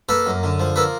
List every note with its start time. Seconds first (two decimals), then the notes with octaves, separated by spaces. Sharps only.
0.09 A#3 A4 B4
0.27 F#2
0.43 D3
0.60 F3
0.76 A#3 A4 B4